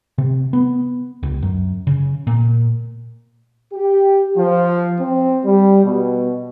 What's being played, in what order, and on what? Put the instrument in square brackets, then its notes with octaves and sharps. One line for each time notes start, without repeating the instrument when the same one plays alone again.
[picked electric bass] C3
B3
C#2
F#2
C#3
A#2
[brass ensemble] G4
F3
C4
G3
B2